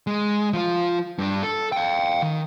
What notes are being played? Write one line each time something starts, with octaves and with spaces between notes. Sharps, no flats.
G#3
F3 F4
G2 D4
A4
F5 G5
D#3